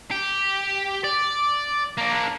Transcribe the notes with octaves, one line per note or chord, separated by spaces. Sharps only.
G4
D5
A#3 D4